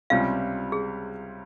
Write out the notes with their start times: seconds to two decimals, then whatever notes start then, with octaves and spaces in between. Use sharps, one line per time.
0.10 C#2 C3 G3 C#4 F4 F5
0.72 G#4